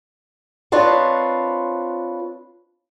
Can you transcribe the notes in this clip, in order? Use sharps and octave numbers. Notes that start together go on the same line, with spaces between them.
C4 D4 F4 B4 C#5 D#5